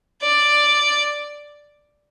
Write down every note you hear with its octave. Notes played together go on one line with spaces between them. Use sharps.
D5